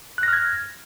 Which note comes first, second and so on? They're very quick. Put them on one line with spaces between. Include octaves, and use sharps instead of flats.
F#6 A#6 F6 G#6